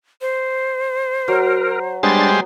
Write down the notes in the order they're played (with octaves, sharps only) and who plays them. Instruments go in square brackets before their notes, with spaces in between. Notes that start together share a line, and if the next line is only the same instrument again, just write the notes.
[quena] C5
[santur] F#3 [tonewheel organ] A#4
[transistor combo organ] G3 G#3 C5 [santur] B3 [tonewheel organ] D4 A6